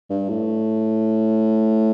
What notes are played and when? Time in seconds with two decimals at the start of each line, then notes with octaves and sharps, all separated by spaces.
0.10 G2
0.29 A2